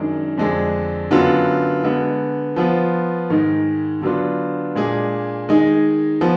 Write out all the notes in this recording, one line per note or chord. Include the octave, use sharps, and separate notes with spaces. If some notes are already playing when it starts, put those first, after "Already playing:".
Already playing: F#2 D#3 G#3 D4
F2 D3 G#3 D4 G#4
F#2 D3 F#3 B3 F4
D3 G#3 B3
F3 B3 F4
G#2 D#3 G#3
D3 F#3 B3 D4 F4
A#2 G#3 D4 G#4
D#3 G#3 D#4 G#4
F3 B3